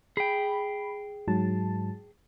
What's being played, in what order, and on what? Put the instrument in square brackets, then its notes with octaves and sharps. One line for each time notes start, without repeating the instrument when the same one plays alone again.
[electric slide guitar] G#4 G5 [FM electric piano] B5
[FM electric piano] G#2 F#3 A5